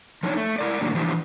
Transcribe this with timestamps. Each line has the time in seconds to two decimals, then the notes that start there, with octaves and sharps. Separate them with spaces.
0.23 F3 A3 D4 D#4 C#5
0.37 A3
0.58 E4 A#4 D5
0.81 A2 D3 D#3 F#3 A#3
0.95 E3 F3 D4 G4 C5